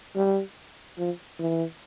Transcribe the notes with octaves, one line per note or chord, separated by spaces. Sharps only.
G3
F3
E3